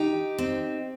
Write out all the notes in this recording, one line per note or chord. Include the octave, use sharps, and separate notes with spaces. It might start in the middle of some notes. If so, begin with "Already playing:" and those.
Already playing: D#4 G4
C4